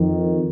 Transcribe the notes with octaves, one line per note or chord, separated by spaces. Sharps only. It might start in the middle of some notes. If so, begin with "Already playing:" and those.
Already playing: F2 D#3